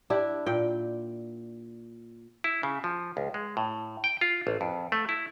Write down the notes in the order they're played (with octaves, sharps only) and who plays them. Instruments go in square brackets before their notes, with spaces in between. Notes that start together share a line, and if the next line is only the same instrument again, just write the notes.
[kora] D4 E4 G4
A#2 G5
[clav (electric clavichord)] E4
C#3
F3
C#2
G#3
A2
G5
F4
A1
F2
A3
E4